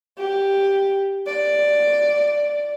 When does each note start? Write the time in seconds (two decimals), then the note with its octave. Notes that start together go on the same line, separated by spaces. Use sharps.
0.19 G4
1.27 D5